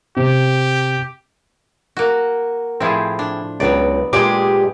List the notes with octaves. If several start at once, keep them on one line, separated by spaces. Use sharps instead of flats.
C3 G4
A#3 F#4
A2 F3 C4 E4 G#4
D4
C#2 F#3 B3 D5
A#2 G#3 G4 G#4